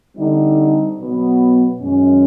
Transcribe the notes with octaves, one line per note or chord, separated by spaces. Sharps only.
D3 G3 C4 D#4
B2 F#3 B3
F#2 D#3 G#3 C#4